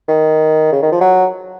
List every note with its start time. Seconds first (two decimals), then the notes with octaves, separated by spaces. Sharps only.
0.08 D#3
0.72 C#3
0.83 D#3
0.92 F3
1.01 F#3